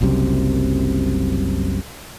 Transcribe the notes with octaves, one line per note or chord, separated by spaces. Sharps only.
F#1 C2 F#2 C3